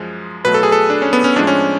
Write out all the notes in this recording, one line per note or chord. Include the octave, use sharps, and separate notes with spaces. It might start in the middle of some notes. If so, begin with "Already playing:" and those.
Already playing: F#2 F3 G#3
B2 F#3 A3 B4
A4
G#4
A4
D4
C#4
B3
C#4
A2 F3 G#3 D4
C#4